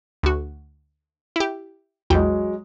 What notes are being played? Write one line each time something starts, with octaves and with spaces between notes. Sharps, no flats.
D2 F#4
E4 G4
A#1 E2 F#3 G#3 G5